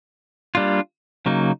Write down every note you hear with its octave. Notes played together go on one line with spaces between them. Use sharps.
G3 A#3 D4 F4
C#3 F#3 A#3 D#4